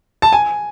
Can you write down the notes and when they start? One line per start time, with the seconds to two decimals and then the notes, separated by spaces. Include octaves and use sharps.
0.22 A5
0.33 G#5